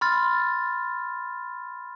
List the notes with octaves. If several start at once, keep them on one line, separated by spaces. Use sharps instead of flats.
B5 C6 F6 A6